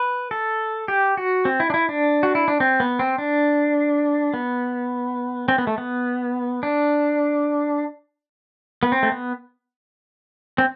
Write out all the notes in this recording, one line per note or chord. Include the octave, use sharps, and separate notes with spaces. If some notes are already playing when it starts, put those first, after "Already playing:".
Already playing: B4
A4
G4
F#4
C4
E4
D4
E4
D4
F#4
E4
D4
C4
B3
C4
D4
B3
C4
B3
A3
B3
D4
B3
C4
A3
B3
C4